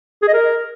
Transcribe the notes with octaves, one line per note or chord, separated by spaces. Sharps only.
G#4
D#5
A#4